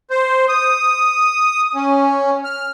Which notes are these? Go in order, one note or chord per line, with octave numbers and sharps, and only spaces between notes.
C5
D#6
C#4
F6